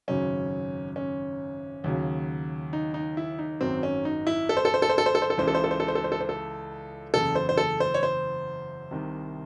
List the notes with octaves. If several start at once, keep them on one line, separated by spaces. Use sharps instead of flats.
G#1 F#2 C#3 F#3 C#4
C#4
D#2 C#3 F#3
D#4
D#4
E4
D#4
G#1 F#2 D#3 F#3 C4
C#4
D#4
E4
A4
C5
A4
C5
A4
C5
A4
C5
A4
C5
A4
C#2 C#3 E3 C5
A4
C5
A4
C5
A4
C5
A4
C5
A4
C5
A4
F#1 E2 C#3 A4
C5
C5
A4
C5
C#5
C5
C2 C3 D#3